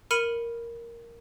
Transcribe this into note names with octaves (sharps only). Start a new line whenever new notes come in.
A#4 B5 F6 C#7 D#7 F#7